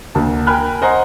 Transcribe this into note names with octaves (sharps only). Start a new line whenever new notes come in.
D2 A#3 A5
A#4 G5 G#5 B5 F6 F#6
C5 D#5 F#5 G#5 A#5 C6